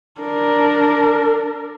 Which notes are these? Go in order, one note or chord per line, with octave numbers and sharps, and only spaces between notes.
D4 A#4